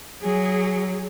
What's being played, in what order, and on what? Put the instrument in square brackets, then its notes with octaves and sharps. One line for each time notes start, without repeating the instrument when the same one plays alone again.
[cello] F#3 [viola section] G#4